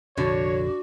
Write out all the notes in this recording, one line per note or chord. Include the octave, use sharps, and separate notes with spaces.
F1 A#1 F2 D3 F#4 C#5